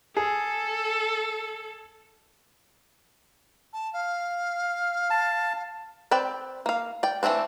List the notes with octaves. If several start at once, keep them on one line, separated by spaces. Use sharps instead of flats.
G#4 A4
A5
F5
A5
C4 B4 D5 G5
A#3 F5
D5 G5
E3 F#3 A3 C4 D4